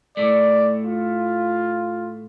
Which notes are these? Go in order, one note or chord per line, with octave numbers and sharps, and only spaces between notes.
A2 A3 D5
F4